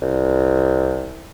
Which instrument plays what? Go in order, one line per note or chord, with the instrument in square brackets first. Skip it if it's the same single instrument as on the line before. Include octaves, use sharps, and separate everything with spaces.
[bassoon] C2